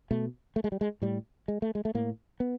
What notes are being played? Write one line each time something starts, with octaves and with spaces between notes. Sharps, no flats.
B2 A3
A3
G#3
G3
G#3
A2 G3
G#3
A3
G#3
A3
A2 A#3
B3